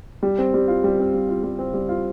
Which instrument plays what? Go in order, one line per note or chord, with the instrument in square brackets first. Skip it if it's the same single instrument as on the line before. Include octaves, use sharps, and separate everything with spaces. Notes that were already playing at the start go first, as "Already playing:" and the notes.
[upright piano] G3
C4
G3
F4
G3
C4
G3
F4
G3
C4
G3
F4